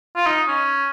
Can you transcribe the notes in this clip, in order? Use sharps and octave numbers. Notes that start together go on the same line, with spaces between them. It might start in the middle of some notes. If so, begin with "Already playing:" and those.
F4
D#4
C#4